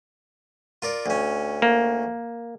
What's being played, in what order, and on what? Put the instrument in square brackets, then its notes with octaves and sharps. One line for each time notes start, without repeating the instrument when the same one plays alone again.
[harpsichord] F4 A#4 D5
D2 C#4
[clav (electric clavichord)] A#3